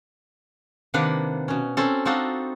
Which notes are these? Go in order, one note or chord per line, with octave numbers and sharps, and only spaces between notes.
C3 D#3 A#3 D4 B4 F#5
B2 C#4
C4 C#4 A4
C4 D4 D#4 F4 F#4 A4